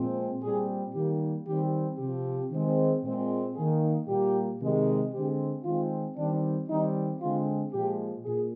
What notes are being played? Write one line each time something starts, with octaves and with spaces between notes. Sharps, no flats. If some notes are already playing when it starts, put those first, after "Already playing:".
Already playing: A#2 F3 G#3 C4
A#2 G3 C4 G#4
D#3 G3 A#3 G4
D#3 G3 C4 G4
C3 F3 C4 G4
D#3 G#3 C4
A#2 G#3 C4
D#3 A#3 G#4
A#2 G3 A#3 G4
C3 D#3 G#3
D3 G#3 C4 G4
D#3 G#3 C4 F4
D#3 G3 C4 D4
D#3 G3 C4 D#4
D3 G#3 C4 F4
A#2 F3 G#3 G4
A#2 G#4